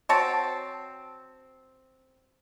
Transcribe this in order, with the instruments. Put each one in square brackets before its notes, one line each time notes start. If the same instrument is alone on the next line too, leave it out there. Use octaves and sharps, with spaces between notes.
[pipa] C4 F#4 C#5 A5